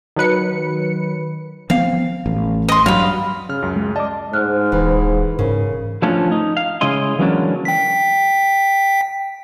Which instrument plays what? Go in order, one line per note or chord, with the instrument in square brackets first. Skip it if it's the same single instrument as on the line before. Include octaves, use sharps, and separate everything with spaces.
[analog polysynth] D#3 F#3 B4 C#7
[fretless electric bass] F3 B3 C4 [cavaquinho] F5
[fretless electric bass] A1
[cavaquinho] D#5 C6
[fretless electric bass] G2 F#3 [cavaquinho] F5 B5
[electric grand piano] C#3 F6
C#2 F#2
[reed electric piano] G#3
[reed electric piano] D5 D6 [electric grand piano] D#5 A5
[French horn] G#2 [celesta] F6 F#6
[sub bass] D#1 [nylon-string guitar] E3 [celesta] C5
[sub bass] G#2 [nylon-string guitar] C#3 [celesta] A#4
[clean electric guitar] F3 A3 C#4 D4 F4
D#4
F5
C#3 G#3 E4 D#5 C6
E3 F#3 G#3 A#3 C#4 D4
[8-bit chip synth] G5 B6